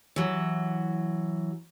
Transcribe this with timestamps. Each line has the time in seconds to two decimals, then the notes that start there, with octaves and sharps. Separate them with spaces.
0.16 E3 F#3